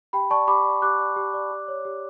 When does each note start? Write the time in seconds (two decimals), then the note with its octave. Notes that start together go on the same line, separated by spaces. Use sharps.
0.13 G4 G5 B5
0.30 D5 A5 C#6
0.48 G4 B5 D6
0.65 D5
0.82 G4 D6 F#6
1.00 D5
1.16 G4
1.34 D5
1.51 G4
1.68 C#5
1.85 G4